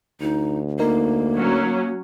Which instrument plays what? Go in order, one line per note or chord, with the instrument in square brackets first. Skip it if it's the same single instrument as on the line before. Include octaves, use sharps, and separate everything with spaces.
[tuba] D2 [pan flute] D#4
[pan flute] A#3 [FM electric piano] D#4 A#4
[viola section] F#3 C#4